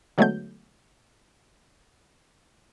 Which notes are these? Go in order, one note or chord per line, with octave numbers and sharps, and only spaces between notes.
D3 F#3 G#3 A3 B3 G6